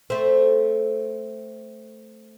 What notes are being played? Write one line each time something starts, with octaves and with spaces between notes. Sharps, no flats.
A3 C4